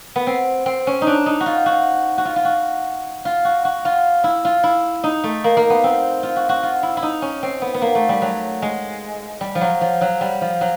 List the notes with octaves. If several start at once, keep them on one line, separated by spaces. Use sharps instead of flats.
B3
C4
C4
C#4
D#4
D4
D#4
F#4
F4
F#4
F#4
F4
F4
F#4
F4
F#4
F#4
F4
E4
F4
E4
D#4
A3
A#3
A#3
B3
C4
F4
F#4
F#4
F4
E4
E4
D#4
C#4
C4
B3
B3
A#3
A3
G3
F#3
G#3
G3
F3
F#3
F3
F#3
G3
F3
F#3